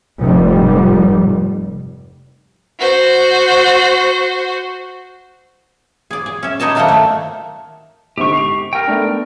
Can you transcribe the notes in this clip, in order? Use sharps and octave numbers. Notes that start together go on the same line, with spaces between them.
F1 G#2 G3
F#4 C5
G#4 D5
G#4
C#4 E5
G3 D#4 C#5 D#5 A5
D#3 F#3 A3 A#3 C5 F#5
D#3 A3
G#1 D3 G4 C#6
C7 F7
A#4 G5
A3 B3 D4